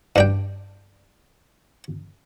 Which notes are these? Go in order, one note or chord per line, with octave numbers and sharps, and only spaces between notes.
G2 D4 G5